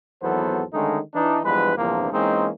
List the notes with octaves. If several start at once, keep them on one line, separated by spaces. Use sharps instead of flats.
G#1 E2 F#3 B3 A4 C5
D3 D#3 G#3 A3 C#4 D#4
E3 D4 D#4
E2 G2 F3 G#3 B4
A#1 E2 G2 C3 F3 A#3
E3 G#3 A#3 C4 C#4 D#4